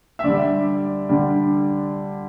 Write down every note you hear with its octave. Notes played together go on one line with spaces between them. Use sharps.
E5
D3 G3 D5
D3 G3